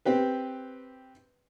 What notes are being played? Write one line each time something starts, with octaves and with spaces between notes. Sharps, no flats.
C4 G4 B4